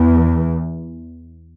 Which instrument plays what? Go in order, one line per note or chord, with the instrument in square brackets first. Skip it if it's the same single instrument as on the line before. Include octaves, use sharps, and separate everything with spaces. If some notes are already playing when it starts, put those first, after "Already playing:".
Already playing: [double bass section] E2